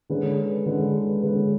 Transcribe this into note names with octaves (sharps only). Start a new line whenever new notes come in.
D3 G#3 C#4 G#4 B4
D3 G#3 C#4 G#4 B4
D3 G#3 C#4 G#4 B4